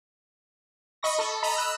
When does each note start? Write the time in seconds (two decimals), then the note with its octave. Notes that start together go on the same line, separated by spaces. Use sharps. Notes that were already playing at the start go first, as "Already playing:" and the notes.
1.03 D#5 B5 C#6 A#6
1.18 A4
1.43 D#5 A#5 B5
1.56 E6 F#6